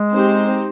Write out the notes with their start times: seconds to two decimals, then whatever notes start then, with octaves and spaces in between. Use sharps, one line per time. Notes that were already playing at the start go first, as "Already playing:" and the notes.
Already playing: G#3
0.14 C4 D#4 G4 C5